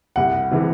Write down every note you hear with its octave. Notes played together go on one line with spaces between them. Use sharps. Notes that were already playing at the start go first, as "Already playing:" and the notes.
C2 F#5
C3 E3 G#3